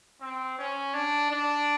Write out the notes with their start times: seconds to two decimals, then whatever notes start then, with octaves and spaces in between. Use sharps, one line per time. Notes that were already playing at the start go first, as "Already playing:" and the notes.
0.21 C4
0.58 C#4
0.94 D4
1.31 D4